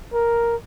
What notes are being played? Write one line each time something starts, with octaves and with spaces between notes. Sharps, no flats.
A#4